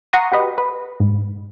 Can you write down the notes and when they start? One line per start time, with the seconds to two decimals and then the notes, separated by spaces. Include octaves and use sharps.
0.13 F#5 A#5 C6 C#6 D#6
0.32 F#4 G4 B4 D#5
0.58 B4
1.00 G#2